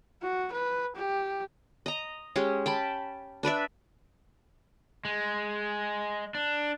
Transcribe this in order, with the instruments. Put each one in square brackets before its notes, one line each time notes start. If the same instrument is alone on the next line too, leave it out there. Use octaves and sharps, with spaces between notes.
[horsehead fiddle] F#4
B4
G4
[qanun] D#5 A#5
G#3 C#4 G4
G5 A5 B5
D4 B4 D5 E5
[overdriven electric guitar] G#3
D4